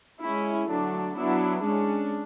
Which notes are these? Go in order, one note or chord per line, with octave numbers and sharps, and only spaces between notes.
G#3 C#4 E4
D3 F#3 A3 D4
F#3 B3 D4 E4
G#3 C#4 D4